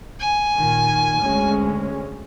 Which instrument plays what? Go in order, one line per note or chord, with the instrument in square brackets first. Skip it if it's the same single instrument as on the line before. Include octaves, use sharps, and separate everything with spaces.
[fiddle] G#5
[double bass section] A#2 D#3
D2 G#3 C#4